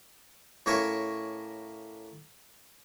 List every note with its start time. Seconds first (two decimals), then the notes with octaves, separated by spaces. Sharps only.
0.66 A2 A#3 C#4 A#4 C#5 E5